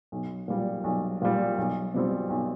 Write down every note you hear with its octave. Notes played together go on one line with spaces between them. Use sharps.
B1
A#2 G3
B1
A#2 G3
B1
B2 G3 C4
B1